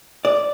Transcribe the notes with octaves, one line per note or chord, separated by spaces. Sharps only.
D5